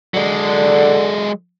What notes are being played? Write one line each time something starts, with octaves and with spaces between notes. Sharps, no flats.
D3 F#3 G#3